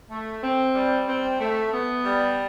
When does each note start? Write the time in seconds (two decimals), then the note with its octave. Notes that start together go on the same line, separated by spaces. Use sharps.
0.10 A3
0.42 C4
0.75 G3
1.08 C4
1.40 A3
1.73 B3
2.04 G3